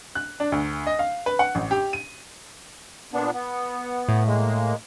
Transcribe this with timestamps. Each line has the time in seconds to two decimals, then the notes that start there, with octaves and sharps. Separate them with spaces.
0.15 F#6
0.40 D4
0.52 D2
0.87 D#5
0.99 F5
1.26 B4
1.39 F#5
1.55 A1
1.71 G4
1.93 D#7
3.13 A#2 B3 D4
3.34 B3
4.09 A2
4.26 G#3 A#3